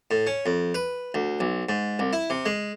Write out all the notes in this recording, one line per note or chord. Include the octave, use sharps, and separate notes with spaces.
A2
C#4
F2
B4
D2
B1
G#2
C2
E4
C3
G#3